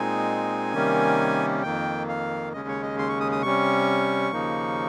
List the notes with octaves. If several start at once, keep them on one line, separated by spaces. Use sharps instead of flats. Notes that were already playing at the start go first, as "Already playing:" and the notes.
Already playing: A#2 G#3 C4 D#4 G#5
C3 D#3 G3 A#3 C#4
F2 D#3 A#3 G5
F5
D#2 C#3 G#3 C#4 D#5
C#5
D#5
C6
C#6
D#6
D#6
C3 G3 C#4 C#6
D#2 C#3 F3 A#3 D#4